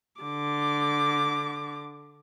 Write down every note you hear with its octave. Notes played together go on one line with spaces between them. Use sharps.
D3 D6